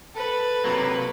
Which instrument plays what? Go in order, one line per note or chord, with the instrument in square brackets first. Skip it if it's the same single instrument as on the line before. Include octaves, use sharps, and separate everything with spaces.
[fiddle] A4 B4
[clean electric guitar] C3 F#3 A#3